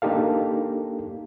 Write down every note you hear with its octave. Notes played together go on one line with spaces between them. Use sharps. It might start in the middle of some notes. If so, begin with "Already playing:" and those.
A#3 D4 D#4 G4 A4 F5